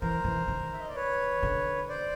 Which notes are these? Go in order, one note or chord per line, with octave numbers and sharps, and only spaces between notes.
E3 A#4 C5
E3
D#3
E5
D#5
D5
B4 C#5
D3
C5 D5